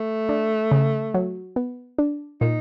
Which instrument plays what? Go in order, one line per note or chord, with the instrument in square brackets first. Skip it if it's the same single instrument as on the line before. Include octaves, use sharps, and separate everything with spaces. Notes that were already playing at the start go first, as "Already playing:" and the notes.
Already playing: [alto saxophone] A3
[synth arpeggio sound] D4
C#3
F#3
B3
D4
[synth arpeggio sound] A#2 [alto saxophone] D#4